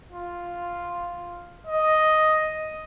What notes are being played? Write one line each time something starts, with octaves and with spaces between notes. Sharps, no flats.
F4
D#5